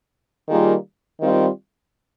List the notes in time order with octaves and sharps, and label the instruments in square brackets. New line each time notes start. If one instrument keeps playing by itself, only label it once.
[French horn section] D#3 G3 A#3 F4 G#4
D#3 G3 C4 F4